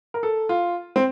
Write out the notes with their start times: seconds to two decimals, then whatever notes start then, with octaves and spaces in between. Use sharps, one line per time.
0.14 A#4
0.23 A4
0.49 F4
0.96 C4